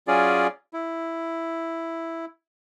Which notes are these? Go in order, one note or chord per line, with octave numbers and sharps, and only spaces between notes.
F#3 C#4 F4 G#4 D5
E4